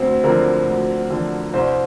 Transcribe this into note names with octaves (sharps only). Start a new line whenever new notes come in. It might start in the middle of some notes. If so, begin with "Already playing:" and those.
Already playing: D2 C4
D3 F3 A#4
D2
D3 F3
C2 C5